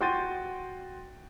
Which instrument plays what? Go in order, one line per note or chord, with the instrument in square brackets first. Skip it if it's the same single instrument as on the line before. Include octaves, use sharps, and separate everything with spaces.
[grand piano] F#4 G5 C6 G6 A6 D#7